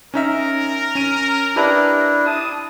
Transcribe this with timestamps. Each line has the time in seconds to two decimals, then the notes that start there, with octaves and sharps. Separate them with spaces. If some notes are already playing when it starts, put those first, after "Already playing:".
0.14 C#4 D#4 A#4 E5
0.95 C#4 D#7
1.56 D4 E4 G4 B4
2.25 C4 A5 D#6